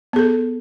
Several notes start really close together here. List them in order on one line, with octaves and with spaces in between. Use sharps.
B3 G#4 A4